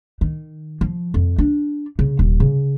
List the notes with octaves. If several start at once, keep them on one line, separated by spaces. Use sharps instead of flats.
D#3
F3
F2
D4
C#3
D#1
C#3